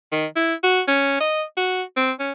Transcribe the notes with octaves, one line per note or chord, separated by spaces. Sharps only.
D#3
E4
F#4
C#4
D#5
F#4
C4
C#4